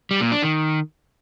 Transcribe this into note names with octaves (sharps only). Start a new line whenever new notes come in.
G3
A#2
D4
D#3